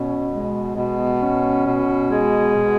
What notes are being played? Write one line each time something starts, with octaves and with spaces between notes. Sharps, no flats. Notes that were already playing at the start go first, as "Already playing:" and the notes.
Already playing: B2 C#4
G#3
B2
C#4
B2
G#3
B2